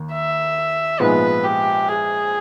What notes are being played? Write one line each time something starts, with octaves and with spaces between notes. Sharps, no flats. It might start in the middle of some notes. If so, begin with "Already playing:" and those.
Already playing: D#2 D#3
E5
A#1 G#2 F3 G#3 B3 B4
G4
G#4